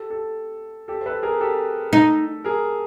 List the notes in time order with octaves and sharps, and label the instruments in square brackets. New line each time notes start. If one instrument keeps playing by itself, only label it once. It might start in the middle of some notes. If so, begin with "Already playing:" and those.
Already playing: [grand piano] G4 A4
G4 A4
G4 A4
C5
A4 B4
G#4 A#4
G4 A4
[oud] D#4
[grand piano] G#4 A#4